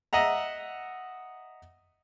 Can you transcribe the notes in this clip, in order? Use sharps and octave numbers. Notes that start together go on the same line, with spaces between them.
D#5 E5 F#5 A#5